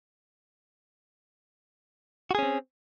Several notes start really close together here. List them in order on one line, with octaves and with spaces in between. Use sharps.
F#4 G#4 C#4 C4